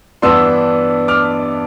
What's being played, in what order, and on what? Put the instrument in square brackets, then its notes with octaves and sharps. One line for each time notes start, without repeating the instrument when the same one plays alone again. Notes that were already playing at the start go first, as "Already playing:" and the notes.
[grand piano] G2 E3 B3 D4 C6 E6
D6 F6